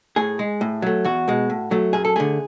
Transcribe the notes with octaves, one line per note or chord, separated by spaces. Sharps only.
A2 G#4
G#3
A2
F#3 A3
E2 F#4
B2 G#3
A2
F#3 A3
F#2 G#4
A4
D3 A3 G#4